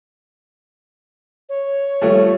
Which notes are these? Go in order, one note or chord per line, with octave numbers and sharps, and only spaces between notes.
C#5
G2 F3 A3